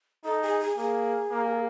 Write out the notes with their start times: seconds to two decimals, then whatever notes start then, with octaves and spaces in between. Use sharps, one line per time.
0.25 D#4 A4
0.42 G#4
0.60 G#4
0.77 A#3 G#4
1.31 A#3